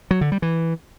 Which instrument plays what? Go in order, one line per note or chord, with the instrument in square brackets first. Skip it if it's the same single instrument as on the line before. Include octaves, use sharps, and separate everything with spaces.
[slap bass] F#3
D3
G3
E3